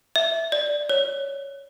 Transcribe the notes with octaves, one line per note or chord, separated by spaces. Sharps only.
E5
D5
C#5